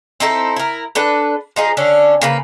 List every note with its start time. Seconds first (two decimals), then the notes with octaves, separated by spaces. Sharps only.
0.20 C4 D#4 E4 A4
0.56 E4 A#4
0.95 D4 A4 B4
1.56 F3 D#4 G#4
1.77 D3 C#4 D4
2.21 C#3 A#3 B4